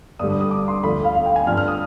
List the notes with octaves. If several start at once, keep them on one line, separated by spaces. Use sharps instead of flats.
G2 D3 G3 D#6
D#6
D#6
D6
C6
D2 D3 F3 B5
F5
F5
G5
G#5
G2 F3 F6
F6
D#6